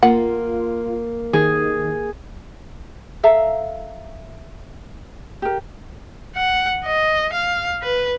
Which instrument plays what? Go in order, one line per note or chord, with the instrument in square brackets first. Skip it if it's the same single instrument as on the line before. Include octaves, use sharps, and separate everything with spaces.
[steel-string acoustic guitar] A#3 [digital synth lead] F4 [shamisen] F#5
[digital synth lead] D#3 [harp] G#4
[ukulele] A4 E5 F5 A#5
G4 A#4
[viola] F#5
D#5
F5
B4